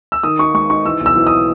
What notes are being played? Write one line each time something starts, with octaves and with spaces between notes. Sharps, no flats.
E6
D#3 D#6
D#4 C#6
G#3 C#6
D#4 C#6
E3 E6
B1
E6
E3
D#6